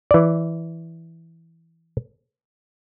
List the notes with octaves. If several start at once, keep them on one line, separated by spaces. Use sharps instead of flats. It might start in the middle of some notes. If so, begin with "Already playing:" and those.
E3 D5